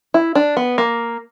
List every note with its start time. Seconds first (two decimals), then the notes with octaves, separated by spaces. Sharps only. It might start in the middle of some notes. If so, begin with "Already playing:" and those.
0.14 E4
0.35 D4
0.57 B3
0.78 A#3